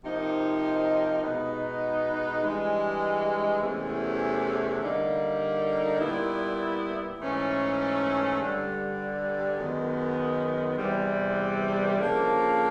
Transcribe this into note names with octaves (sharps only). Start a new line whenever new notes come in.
C3 F3 A#3 D#4
B2 G#3 B3 D#4
G2 E3 G#3
E2 C3 E3 A3 C#4
D3 G3 A#3 D#4
A#2 G3 B3 E4
G#2 E3 A3 C#4
G2 D3 G3
F#2 D#3 G#3 B3
E2 C3 E3 G3
F2 C#3 F3 A#3 D4